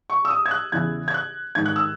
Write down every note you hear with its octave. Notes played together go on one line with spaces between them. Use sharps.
C#6
E6
D#6
G#6
F#6
E2 C#3 E3 G#6
G#6
F#6
G#2 D#3 G#6
F#6
E6